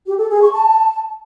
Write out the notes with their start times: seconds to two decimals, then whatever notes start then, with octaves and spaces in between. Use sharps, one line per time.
0.06 G4
0.18 A4
0.30 G#4
0.41 C#6
0.53 A5